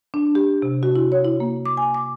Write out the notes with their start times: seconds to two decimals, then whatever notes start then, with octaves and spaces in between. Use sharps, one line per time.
0.14 D4
0.35 G4
0.62 C3
0.83 F#4
0.96 E4
1.12 C#5
1.24 E4
1.40 A#3
1.65 D6
1.77 G#5
1.94 D6